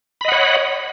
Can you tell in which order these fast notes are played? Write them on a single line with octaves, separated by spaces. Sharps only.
B5 D#5 F#5 C#5